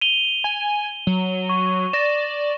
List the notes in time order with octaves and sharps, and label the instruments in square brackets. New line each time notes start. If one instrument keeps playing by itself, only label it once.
[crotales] D#7 F7 G7
[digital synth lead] G#5
F#3
[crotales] C#6
[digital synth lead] D5 [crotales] A#6 E7